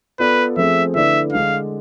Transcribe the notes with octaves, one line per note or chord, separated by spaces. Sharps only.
B3 F4 A4 B4 D5
F3 A3 C4 G#4 E5
D3 A3 E4 B4 D5 E5
D3 G#3 D4 F5